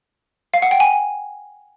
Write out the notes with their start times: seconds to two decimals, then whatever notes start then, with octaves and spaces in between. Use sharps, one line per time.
0.54 F5
0.62 F#5
0.71 G5
0.80 G#5